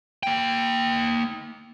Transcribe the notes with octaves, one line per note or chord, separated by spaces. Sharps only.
A#3 G5